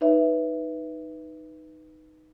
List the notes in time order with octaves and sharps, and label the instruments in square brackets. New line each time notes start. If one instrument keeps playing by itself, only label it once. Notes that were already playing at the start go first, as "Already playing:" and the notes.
[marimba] D#4 B4 C#5 E5